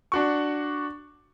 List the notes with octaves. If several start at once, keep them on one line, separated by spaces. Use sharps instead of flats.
D4 F#4 C#6